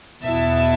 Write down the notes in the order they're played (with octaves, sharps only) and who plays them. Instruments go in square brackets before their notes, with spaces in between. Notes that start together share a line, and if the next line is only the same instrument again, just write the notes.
[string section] E2 B2 B3 E4 E5 A5